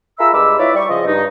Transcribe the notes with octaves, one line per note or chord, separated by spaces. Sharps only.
F4 G#4 A#4 E5 B5 E6
G2 G#3 B5 D6 E6
E4 F4 B4 C#5 D5 E5
G3 C#6
C#3 F3 D#5
G2 D#4